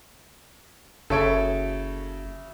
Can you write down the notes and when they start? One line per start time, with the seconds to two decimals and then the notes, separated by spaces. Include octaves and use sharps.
1.10 F#1 C#3 A4 C#5 E5 D7